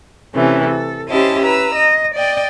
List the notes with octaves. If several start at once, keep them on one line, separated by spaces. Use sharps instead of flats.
C3 E3 A3 C#4
A4
C#4 E4 G4 C5 D#5 A5
B4 A#5 E6
D#5
D5 D#5 G5